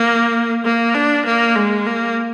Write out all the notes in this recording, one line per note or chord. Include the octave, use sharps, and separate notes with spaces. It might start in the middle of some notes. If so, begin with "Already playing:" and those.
Already playing: A#3
A#3
D4
A#3
G#3
A#3